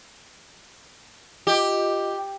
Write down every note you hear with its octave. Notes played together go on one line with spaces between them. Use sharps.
F4 G4 D#5